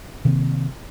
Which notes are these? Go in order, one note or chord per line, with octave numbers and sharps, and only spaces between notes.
C3 D#3 A#3 C4